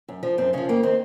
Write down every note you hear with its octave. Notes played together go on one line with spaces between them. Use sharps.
F#2
F3
F#2 C4
C#3 F3 C#4
F2 A#3
D#3 C4